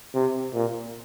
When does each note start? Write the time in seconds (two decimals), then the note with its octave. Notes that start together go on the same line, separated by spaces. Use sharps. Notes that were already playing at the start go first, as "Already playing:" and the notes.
0.14 C3
0.54 A#2